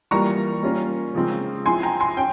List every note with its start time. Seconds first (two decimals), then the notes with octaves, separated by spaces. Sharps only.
0.11 E3 G3 A#3 F4 A#5 C#6
0.63 G3 A#3 C#4 F4
1.15 C#3 F3 G#3 C4
1.66 F3 C4 E4 G#5 C6
1.83 G5 A#5
2.00 G#5 C6
2.17 C#4 G5